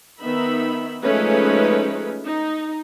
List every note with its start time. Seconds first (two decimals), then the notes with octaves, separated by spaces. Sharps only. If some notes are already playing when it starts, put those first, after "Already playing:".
0.21 D#3 B3 D#4 E5 B5
1.02 F3 G#3 A3 C#4 D#4 B4
2.25 D#4